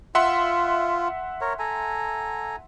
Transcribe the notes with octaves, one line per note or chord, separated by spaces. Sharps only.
F4 E5 F#5 C6
A#4 C#5
A4 G#5 A#5